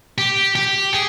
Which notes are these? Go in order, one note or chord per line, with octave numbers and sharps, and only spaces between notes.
G4
G4
G#4